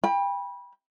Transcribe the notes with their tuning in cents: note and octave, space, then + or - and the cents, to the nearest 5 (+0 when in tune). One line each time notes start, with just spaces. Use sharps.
G5 +30 B5 -20